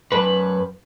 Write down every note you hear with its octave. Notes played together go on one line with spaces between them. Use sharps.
F#2 B4